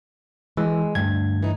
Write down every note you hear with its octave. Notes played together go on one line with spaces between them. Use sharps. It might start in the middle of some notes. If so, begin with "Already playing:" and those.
E3 G#3
D2 G2 G#6
E3 D#4